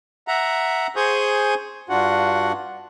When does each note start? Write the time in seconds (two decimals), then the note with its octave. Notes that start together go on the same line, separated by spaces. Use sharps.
0.28 E5 F#5 A#5
0.96 G#4 C5 G#5 C#6 D#6 G6
1.90 G2 D4 F4 F#4 F#5